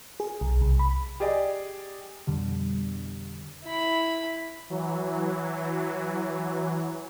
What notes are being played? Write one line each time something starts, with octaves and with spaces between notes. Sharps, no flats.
G#4
B1
C2
B5
G4 G#4 D5 D#5
F2 B2 D3 G3
E4 B5
E3 F#3